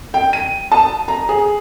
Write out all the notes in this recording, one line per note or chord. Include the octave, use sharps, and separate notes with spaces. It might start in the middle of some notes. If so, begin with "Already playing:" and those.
G5
D#7
A5
A#5
G#4